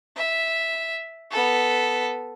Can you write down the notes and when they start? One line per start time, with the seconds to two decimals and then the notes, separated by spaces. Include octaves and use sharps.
0.16 E5
1.31 B3 A4